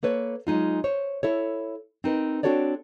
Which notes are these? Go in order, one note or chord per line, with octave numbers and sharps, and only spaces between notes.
A#3 A4 B4 C#5
F#3 G#3 D#4 F4
C5 C#5
E4 A4 C#5
C4 D#4 A#4 B4
C4 D4 F#4 A4 C#5 D5